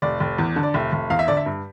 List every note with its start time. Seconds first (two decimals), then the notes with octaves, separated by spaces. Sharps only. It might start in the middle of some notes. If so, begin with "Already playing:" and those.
0.02 F1 D5
0.20 F1
0.38 E2
0.56 D3
0.63 D5
0.74 F1 E5
0.92 F1
1.10 E2 F5
1.19 E5
1.28 D3 D5
1.37 E5
1.46 G2